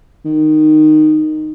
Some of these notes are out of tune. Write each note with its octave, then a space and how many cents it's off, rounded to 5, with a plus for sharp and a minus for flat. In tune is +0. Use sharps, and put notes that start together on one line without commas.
D#3 -15